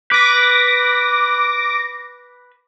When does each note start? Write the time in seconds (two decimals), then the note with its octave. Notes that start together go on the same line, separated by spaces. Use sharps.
0.11 B4 D6 A#6